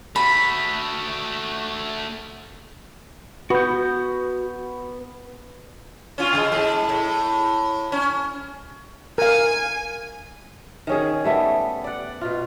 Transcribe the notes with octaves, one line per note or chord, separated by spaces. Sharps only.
A3 F#4 B5
B3 F#4 G6
C#4 F4
C#3 G#3
A2 G#3
A2
C#4
A#4 F5 G#5
D#3 C#4 G#4
G3 A3 B3
D5 F#5
B2 F4